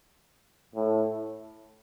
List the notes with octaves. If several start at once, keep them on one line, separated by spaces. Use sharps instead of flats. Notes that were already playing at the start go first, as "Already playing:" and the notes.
A2